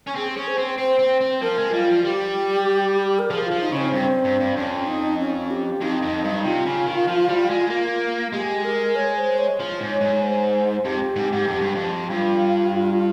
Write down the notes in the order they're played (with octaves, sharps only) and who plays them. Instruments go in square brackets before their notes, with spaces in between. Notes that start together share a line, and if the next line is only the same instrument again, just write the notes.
[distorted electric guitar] C#4
[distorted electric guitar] C4 [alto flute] G#4
[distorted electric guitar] C#4 [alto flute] G#4
[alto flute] C5
[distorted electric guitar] C4
[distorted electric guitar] C4 [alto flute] C5
[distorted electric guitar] C4
C4
[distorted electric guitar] F3 [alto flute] A#4
[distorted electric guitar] G#3
[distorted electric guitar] G3 [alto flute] F4
[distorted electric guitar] F3
[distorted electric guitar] G3 [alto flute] G4
[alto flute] A#4
[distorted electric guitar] F3 [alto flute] G#4
[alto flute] F4
[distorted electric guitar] F3
[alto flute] D#4
[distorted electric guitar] C#3
[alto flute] C4
[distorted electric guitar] G2 [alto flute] C4
[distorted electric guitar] G2
G2
[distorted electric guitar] F2 [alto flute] C#4
[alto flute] D#4
C#4
G4
[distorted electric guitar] F2 [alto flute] D#4
[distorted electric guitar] F2
G2
[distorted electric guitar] C3 [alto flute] F4
[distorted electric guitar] C#3
D#3
F3
G3
G#3
A#3
[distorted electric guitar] G#3 [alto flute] G4
[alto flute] A#4
C#5
C5
C#5
[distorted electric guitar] F3
G#2
[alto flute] C#5
[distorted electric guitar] G#2
[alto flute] C5
[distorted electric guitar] F2 [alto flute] G4
[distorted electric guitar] G#2
G#2
F2
G2
F2
[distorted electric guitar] G2 [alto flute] F4